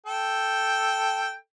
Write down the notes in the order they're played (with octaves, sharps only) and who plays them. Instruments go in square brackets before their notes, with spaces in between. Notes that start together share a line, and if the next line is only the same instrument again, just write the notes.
[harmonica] A4 G5